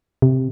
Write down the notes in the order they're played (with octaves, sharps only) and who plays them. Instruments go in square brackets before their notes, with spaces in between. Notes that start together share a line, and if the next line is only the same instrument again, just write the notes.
[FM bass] C3